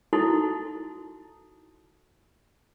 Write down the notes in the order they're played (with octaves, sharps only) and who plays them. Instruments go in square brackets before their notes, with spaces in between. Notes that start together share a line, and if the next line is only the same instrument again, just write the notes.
[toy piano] D#4 E4 F#4 A4